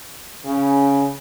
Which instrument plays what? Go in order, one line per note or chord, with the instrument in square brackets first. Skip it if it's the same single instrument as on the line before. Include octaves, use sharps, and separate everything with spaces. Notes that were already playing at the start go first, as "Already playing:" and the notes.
[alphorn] C#3